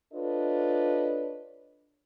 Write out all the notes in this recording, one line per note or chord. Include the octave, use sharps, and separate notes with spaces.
D4 F4 A4 B4 C#5 D#5